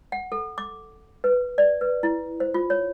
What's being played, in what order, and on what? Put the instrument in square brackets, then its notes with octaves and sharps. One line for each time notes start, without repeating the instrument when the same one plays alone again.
[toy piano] F#5
A4
D6
B4
D5
B4
E4
C5
F4
C#5